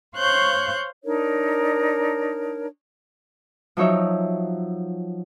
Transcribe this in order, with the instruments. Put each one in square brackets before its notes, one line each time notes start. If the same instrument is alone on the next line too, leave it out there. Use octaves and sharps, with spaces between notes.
[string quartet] C5 C#5 F5 C#6 F#6 G6
[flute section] D4 D#4 A#4 C#5
[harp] F3 F#3 D#4 C#5 E5